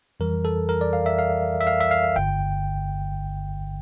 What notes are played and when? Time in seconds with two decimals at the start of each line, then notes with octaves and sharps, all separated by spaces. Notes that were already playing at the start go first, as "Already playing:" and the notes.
0.20 F2 E3 G3 A#4
0.45 A4
0.69 A#4
0.81 D5
0.93 F5
1.06 E5
1.19 F5
1.61 E5
1.67 F5
1.81 E5
1.91 F5
2.16 G1 G2 D3 G5